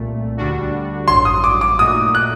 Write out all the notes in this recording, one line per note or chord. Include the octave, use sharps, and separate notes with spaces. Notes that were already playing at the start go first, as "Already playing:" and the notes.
Already playing: C2 A#2 A3
D2 D3 G3 D4 F#4
A1 G2 F#3 C6
D#6
D6
D6
A#2 A3 D#4 F#4 D#6
F#6